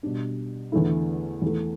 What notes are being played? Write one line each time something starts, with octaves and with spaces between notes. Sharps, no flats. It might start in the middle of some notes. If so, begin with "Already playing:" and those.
B2 G3 D4
E2 D3 A3 E4
E2 E3 A3